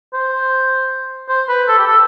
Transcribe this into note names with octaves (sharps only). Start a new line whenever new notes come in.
C5
C5
B4
A4
G4
A4